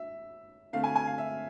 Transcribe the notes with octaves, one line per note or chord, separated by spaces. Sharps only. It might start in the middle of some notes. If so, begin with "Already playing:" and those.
Already playing: E5
D3 A3 C4 F5
G#5
G#5
F5
E5